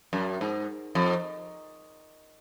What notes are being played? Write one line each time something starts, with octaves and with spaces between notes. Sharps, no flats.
F#2
G#2
F2